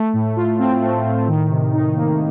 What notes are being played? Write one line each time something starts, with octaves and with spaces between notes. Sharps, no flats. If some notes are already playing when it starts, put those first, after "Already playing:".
Already playing: A3
A2
F4
C4
A3
A2
D#3
C3
D#4
A#3